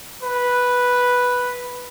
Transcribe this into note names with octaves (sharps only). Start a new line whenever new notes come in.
B4